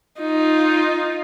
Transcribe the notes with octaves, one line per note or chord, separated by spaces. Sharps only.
D#4 F4